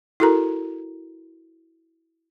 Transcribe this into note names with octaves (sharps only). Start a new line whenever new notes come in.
E4 F#4 A4 A#4 A#5